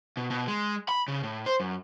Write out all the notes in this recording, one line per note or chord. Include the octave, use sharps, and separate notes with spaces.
B2
B2
G#3
B5
C#3
A2
C5
F#2